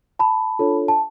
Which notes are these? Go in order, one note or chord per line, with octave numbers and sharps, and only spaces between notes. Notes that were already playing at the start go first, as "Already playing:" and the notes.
A5 B5
D4 F4 A4 C#5
A5